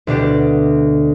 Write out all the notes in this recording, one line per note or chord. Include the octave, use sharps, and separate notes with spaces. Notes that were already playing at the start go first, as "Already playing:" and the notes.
D2 B2 D4 G4